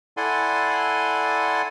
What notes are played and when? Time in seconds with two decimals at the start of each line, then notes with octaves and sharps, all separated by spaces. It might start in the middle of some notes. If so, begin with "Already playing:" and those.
0.17 E4 A4 D5 F#5 G#5 C6